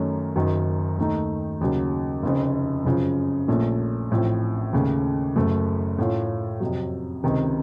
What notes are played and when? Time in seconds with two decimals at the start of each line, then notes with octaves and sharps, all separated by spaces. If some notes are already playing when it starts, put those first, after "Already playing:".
Already playing: F#2 D#3 A3 C#4
0.36 F#1 F#2 D#3 F#3
0.98 D#2 D#3 A3 D#4
1.61 D#2 C#3 F#3
2.22 F1 F2 C#3
2.85 F#2 C#3 F3
3.48 A#1 A#2 A3 C#4
4.11 A1 A2 F3 C4
4.73 D#2 C#3 A3
5.36 F#1 F#2 C#3 A3
5.98 A2 A3 C#4 F4
6.60 F2 C3 F#3
7.24 C#2 C3 D#3